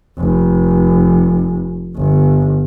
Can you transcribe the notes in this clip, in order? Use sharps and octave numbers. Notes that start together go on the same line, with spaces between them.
F1
G1